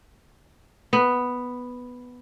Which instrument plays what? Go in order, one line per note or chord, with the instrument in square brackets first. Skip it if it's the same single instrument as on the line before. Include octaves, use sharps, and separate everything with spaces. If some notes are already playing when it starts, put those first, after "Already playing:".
[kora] B3